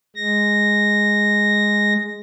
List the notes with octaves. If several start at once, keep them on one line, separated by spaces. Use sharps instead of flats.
G#3 A#6